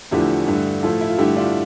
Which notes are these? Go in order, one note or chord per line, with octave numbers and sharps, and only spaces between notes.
E2 D3 F3 A3 E4 G4
G2 D3 A3
A2 F3 A3 F4 A4
E4
F4
G2 D3 A3 E4 G4
D4 F4